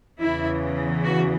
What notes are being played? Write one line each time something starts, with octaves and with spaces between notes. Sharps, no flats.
E2 C#3 E3 E4
F#4